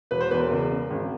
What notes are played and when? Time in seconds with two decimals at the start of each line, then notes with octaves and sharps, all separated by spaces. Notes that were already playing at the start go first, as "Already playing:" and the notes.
0.11 E1 B4
0.21 C5
0.31 E2 B4
0.40 A#4
0.51 C#2
0.71 C#3
0.90 G#1